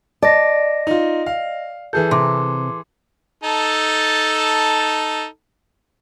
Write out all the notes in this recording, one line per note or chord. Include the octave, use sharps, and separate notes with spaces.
D5 D#5 A5 A#6
D#4 F4
F5
E3 G#4 A4 G6
C3 C6 D6
D#4 A4 A5